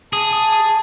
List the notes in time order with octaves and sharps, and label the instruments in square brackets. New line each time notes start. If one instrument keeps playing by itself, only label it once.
[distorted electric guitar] G#4 [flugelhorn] A5 [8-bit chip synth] D#6